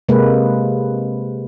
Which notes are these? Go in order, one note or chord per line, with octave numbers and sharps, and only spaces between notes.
C3 G#3 A#3 B4